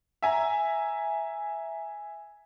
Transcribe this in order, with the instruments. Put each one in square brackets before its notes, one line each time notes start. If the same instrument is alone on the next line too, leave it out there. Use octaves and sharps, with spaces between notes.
[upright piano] E5 G#5 A#5